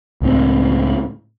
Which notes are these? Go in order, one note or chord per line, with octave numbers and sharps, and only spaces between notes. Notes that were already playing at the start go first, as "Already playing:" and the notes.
C#2 A2 C4